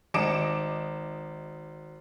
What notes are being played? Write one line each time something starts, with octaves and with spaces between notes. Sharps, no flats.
G#1 D#5 D6 C#7 D7 E7